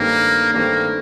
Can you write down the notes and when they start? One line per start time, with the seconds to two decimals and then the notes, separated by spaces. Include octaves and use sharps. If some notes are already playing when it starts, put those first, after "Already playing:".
Already playing: G2 D#3 A3 A#3 C4
0.54 G2 D#3 A3 A#3 C4